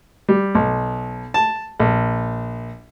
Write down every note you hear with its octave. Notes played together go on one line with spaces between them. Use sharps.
G3
B1
A5
A#1